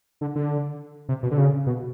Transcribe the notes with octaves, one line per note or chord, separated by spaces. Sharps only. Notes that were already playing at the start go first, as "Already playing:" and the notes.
D3
D3
C3
B2
D3
C#3
B2